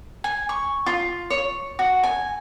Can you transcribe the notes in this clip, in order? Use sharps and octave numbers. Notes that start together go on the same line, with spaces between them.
G#5
C#6
F4
C#5
F#4
G#5